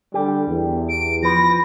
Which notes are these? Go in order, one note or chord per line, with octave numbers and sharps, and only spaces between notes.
D3 G3 G4
E2
D7
F3 B4 A#6